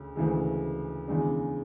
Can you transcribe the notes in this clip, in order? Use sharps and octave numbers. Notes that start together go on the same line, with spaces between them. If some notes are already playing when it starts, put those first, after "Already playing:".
Already playing: D2 C#3
D2 C#3 E3 G#3
E2 C#3 G#3 D4